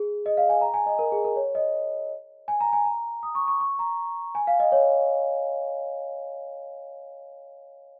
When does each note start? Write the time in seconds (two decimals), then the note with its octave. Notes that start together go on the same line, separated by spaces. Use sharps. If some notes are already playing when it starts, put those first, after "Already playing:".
Already playing: G#4
0.26 D#5
0.37 F5
0.49 G#5
0.61 A#5
0.74 G#5
0.86 D#5
0.99 A#4
1.12 G#4
1.24 A#4
1.36 C#5
1.55 D#5
2.48 G#5
2.60 A#5
2.73 G#5
2.85 A#5
3.23 D#6
3.35 C#6
3.48 C#6
3.60 C#6
3.79 A#5
4.35 G#5
4.47 F5
4.60 D#5
4.72 C#5